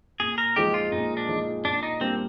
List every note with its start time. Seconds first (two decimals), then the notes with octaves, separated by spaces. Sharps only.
0.20 A#2 G#4
0.38 A#4
0.56 F3 G#3 D#4 G4
0.74 F4
0.92 A#2 D#4
1.17 D4
1.28 F3 G#3 D#4
1.65 A#2 D4
1.83 D#4
2.00 G3 A#3 C4 D4